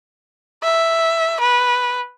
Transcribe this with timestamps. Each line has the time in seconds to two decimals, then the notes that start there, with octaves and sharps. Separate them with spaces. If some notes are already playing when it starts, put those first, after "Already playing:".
0.63 E5
1.40 B4